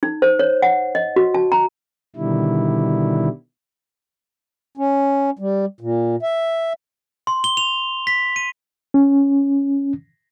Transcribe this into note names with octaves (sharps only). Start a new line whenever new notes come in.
D#4
C5
C#5
F#5
D#5
F#4
A5
A#5
B2 D3 D#3 G3 E4
C#4
G3
A#2
E5
C6
G7
F7
B6
D#7
C#4